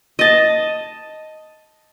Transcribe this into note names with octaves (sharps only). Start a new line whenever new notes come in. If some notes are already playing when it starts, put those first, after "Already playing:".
D#5 A5